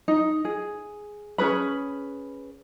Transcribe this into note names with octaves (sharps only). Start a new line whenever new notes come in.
D#4
G#4
C#4 G#4 B4 B5